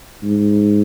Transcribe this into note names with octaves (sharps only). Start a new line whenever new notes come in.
G#2